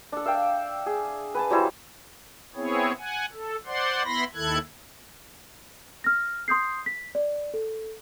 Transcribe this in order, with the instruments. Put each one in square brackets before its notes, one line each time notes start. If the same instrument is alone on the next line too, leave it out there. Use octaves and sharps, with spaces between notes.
[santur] D4 A4
E5 F5 G5 E6
G#4
B4 G#5 A5
F#3 G3 E4 C5
[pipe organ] B3 C4 E4 G#4 C#5
F#5 G#5
A4
C5 D5 F#5 C6
B3 E4 B5 C6 A#6
D#2 D#3 E4 A4 F#6 G#6
[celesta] F6 A#6
C6 D#6 G6 C7
B6
D5
A4